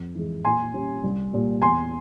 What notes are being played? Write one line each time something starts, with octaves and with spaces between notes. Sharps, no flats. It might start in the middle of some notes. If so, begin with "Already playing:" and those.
Already playing: F2
E3 G#3
A#2 G#5 C6
G3 C#4
C2
A#2 G3
E2 G#5 C6